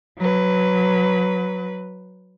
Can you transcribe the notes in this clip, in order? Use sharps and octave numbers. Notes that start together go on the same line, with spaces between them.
F#3 B4